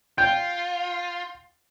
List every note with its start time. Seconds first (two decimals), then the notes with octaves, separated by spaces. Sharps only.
0.18 F4 G5